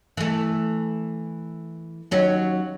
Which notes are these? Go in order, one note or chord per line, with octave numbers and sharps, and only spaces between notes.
E3 A3
D#2 F#3 C#4